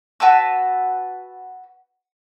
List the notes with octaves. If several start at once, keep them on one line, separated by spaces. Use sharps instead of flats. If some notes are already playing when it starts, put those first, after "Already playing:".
F#4 B4 A5 E6